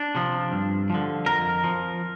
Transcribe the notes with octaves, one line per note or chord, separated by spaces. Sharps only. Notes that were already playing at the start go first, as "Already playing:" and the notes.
Already playing: D4
C3 F3
G2
D3 F3
F2 A#4
F3